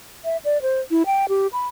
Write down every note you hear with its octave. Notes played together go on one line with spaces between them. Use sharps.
E5
D5
C5
E4
G5
G4
B5